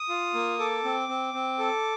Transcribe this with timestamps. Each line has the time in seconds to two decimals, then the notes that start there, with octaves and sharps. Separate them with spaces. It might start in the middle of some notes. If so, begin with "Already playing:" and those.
Already playing: D#6
0.09 F4
0.34 A#3
0.59 A4 D6
0.84 C4
1.09 C4
1.34 C4
1.59 A4